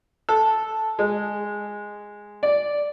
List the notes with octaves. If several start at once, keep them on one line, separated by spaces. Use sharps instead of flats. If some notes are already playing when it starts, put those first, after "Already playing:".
A4
G#3
D5